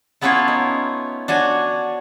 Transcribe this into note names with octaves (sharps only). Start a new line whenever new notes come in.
A3 B3 C#4 E4 F4 C#5
D#4
D4 F#4 C#5 G#5